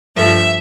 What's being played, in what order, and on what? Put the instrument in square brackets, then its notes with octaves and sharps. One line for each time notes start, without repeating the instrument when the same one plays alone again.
[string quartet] G2 F3 A3 E5